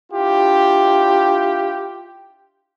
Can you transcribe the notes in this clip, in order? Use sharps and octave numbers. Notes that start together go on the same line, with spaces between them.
D4 E4 F4 G4